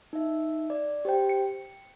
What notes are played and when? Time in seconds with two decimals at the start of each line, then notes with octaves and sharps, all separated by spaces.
0.13 D#4 E5
0.70 D5
1.05 G4 C5 G5
1.29 C#7